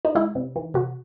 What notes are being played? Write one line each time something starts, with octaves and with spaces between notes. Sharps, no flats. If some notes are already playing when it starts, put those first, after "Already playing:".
D#4
G#3 E4
C3
E3
C3 F#4